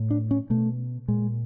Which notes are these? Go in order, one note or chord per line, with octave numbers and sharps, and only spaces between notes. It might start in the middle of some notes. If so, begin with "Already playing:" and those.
Already playing: A2
D4
C#4
B2 A3
A#2 G#3